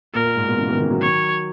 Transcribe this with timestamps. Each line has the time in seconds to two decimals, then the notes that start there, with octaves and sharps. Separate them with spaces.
0.14 A#2 A#4
0.25 A#2
0.36 G#2
0.46 G#2 B2
0.57 C#3 E3
0.68 B2 D#3
0.79 C#3 E3
0.91 D#3 F#3
1.01 C#5